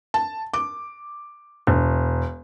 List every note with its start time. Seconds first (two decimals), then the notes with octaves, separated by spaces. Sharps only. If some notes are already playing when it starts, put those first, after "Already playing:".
0.14 A5
0.54 D6
1.67 E1